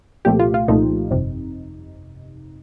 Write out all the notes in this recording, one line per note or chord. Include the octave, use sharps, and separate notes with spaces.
C2 A#2 F3 A3 G4
F4
F4
C2 A#2 F3 A3 D#4
G1 F2 C3